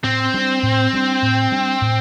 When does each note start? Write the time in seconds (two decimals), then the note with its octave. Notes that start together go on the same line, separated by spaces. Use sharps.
0.04 A2 C4
0.34 G3 D4
0.63 A2
0.93 G3 D4
1.22 A2
1.52 G3 D4
1.81 A2